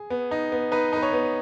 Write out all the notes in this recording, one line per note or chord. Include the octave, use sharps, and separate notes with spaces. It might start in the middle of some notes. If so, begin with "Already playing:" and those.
Already playing: G#4
B3
D#4
B3
D#4 B4
D#4 B4
C#5
B3